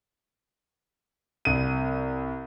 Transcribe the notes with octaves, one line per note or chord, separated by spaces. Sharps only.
C2 D#7